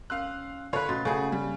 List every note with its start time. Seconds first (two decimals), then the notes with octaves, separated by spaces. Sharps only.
0.10 C#4 F5 C6 E6 F#6
0.73 D3 F4 B4 C#5
0.89 B2 A3 C#4 C6 A6
1.05 C#3 A3 F#4 G#4 G#5
1.32 G3